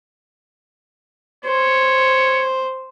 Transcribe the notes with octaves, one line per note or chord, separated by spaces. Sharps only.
C5 C#5